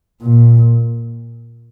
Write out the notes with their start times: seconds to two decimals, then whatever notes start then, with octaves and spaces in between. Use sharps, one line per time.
0.22 A#2